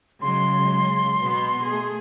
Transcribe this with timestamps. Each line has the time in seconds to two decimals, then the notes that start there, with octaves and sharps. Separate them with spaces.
0.22 C#3 F#3 G#3 C6
1.20 B2 B3
1.63 A3 G#4